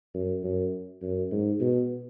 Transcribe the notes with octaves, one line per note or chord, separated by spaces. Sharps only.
F#2
F#2
F#2
G#2
B2